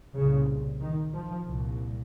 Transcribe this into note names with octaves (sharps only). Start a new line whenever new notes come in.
C2 A#2 C#3
D#3
F3
C2 A#2